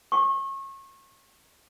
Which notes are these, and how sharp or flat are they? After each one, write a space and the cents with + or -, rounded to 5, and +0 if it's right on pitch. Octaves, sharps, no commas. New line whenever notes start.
C#6 -30